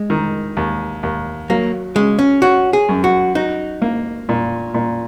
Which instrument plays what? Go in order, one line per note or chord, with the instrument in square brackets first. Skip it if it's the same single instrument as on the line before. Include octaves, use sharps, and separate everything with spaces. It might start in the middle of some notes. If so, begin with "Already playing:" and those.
Already playing: [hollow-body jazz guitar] G#3
[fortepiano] D#3
D#2
D#2
[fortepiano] F#3 [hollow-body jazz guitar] A#3
[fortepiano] C#3 [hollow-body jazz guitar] G#3
[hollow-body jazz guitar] C#4
[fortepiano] C#4 [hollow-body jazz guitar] F#4
[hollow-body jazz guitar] G#4
[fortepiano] F#2
[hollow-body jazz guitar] F#4
[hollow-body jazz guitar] D#4 [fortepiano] F#4
[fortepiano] A#3
A#2
A#2